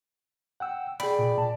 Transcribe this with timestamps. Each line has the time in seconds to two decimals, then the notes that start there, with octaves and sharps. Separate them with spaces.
0.60 F#5 G5 E6
1.00 G#4 D5 G5 B5
1.19 A#2
1.38 A5